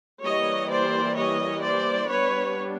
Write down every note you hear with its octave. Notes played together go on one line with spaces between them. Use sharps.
E3 G3 A#3 C#5 D#5
C5 D5
C#5 D#5
C5 D5
G3 B3 D4 B4 C#5